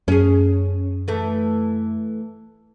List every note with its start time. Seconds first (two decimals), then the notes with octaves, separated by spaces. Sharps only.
0.08 F#2 C#4 G#4
1.08 E3 A3